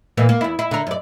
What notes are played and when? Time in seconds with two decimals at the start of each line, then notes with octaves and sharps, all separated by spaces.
0.17 A#2 E3 A#3
0.29 A#3
0.41 E2 E4
0.59 E4
0.71 D3 A#4
0.87 F#2 D5